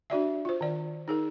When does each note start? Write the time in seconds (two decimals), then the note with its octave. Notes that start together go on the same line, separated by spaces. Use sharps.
0.10 D4 F#4 D5 E5
0.45 F4 C5
0.61 D#3 D5
1.08 D#4 G#4 A#4